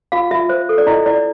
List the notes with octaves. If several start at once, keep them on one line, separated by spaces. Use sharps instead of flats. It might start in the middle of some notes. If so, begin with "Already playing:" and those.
F4 F5
F4 E5
C5
A4
D5
E4 D#5
E4 D5